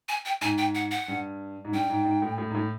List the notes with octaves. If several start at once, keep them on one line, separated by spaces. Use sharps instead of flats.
G#5
G5
G#2 G#5
G5
F#5
F#5
G2
G#2
G2 G5
G#2
G#2
A2
A2
G#2
A2